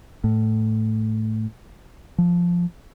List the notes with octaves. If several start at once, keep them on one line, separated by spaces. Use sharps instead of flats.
A2
F3